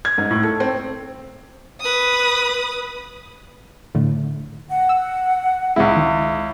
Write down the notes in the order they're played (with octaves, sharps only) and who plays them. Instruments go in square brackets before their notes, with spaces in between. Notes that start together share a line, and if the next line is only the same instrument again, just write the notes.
[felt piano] G#6
G#2
A2
A4
C4
[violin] B4 D#6
[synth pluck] A2 D3 A3
[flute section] F#5
[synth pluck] E6
[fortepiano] C#2 E4 [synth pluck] G#3 C4
[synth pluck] D#3